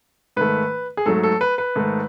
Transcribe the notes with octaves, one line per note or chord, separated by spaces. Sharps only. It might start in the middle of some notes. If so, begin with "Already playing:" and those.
G#2 D#3 A3 B4
G#4
G#2 F#3 A3 A4
A4
B4
B4
G#2 D#3 A3